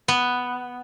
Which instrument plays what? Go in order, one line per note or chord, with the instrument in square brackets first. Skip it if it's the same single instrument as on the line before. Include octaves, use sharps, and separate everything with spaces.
[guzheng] B3